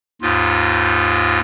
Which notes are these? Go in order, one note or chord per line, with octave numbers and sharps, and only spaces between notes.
D#2 G#2 F4